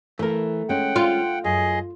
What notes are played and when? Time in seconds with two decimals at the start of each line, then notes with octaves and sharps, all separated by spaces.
0.19 E3 A3 A#4
0.69 G#3 C#4 F#5 G5
0.96 F4
1.44 F#2 G#4 D#5